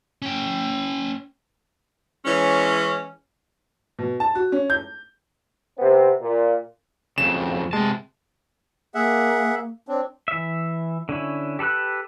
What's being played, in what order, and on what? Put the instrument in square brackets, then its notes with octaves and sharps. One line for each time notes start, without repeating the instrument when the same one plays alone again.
[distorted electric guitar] C#4 G5
[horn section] E3 G#3 C#4
[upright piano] B2
A5
F#4
C#4
G6
[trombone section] C3 B3 C4
A#2
[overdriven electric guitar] F2 C#3 [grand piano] E7
[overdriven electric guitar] C3 A5 [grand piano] G#3
[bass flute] A#3 [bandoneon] G#4 E5 F#5
[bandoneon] C4 D4 [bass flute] C#5
[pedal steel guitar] E3 E5
D3 C#4 E4
G4 A4 B4 E6 F#6